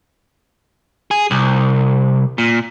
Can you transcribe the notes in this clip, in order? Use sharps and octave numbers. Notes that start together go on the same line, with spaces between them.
G#4
C2
A#2